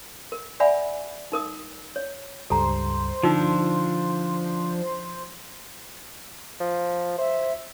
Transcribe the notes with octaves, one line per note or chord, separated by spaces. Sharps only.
A#4
D5 E5 F#5 G#5 B5
D#4 A#4 D#6
C#5
C#2 G2 G3 A4 C5 A#5
D3 F3 D4 D#4 F4 E6
F3
C5 E5